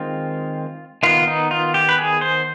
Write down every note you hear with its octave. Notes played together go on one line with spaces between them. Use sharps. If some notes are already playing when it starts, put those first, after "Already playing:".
Already playing: D#3 G#3 C4 F4
D#3 B3 F4
D#4
F4
G4
B4
G#4
C5